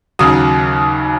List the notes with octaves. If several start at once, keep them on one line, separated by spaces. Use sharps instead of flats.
D#2 C#3 F#3 D#6